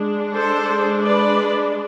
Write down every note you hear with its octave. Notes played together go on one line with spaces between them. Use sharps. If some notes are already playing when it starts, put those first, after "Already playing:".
Already playing: G#3 D4
A4 C5
B4 D5